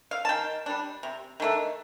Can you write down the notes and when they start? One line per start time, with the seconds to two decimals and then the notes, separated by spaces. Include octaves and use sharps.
0.11 F5
0.25 A5
0.29 D#3 G5
0.66 G3 D4
1.03 C3
1.40 D#3 A3 D4